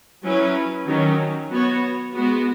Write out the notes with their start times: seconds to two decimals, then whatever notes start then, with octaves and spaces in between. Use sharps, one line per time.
0.23 F#3 C#4 E4 B4
0.87 D#3 F#3 C#4
1.51 B3 F#4 C#5
2.14 G#3 B3 F#4